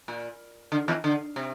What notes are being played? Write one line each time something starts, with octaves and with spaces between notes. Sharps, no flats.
A#2
D3
E2 E3
D3
C3